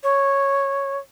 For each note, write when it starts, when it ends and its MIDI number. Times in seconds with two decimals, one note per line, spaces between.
0.03 0.98 73